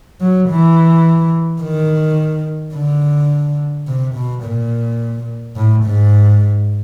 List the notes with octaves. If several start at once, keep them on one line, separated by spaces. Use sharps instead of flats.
F#3
E3
D#3
D3
C3
B2
A#2
A2
G#2